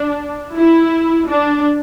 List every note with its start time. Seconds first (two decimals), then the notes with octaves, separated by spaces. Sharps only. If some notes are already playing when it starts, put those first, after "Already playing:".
Already playing: D4
0.55 E4
1.29 D4